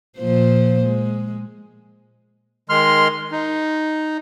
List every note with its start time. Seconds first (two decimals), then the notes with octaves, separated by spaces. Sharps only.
0.18 A#2 F3 C5
0.85 G#3
2.69 D#3 G#3 C6 F6
3.32 D#4